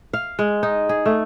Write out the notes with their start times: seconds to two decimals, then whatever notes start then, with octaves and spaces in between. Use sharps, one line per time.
0.13 F5
0.39 G#3
0.63 D#4
0.89 G#4
1.06 A3